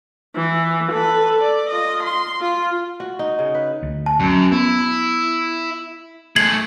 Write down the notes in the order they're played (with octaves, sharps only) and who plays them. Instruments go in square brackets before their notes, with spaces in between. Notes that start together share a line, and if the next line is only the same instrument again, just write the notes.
[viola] E3
A4 B4
D5
F4 D#5
C6
F4
[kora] F#4
D#4
C#3
B4
[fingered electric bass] D2
[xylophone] A5
[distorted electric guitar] F#2
[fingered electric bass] B3 [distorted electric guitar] E4
[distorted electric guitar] A3 G#4 [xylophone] G#6 C7 F#7